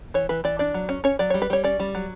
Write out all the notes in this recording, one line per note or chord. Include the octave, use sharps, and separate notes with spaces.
E3 C#5
E3 B4
E3 D5
D4 D5
F#3
C#4
C#4 C#5
F#3 D5
G3 C#5
B4
G3 C#5
C#4 D5
G3
F#3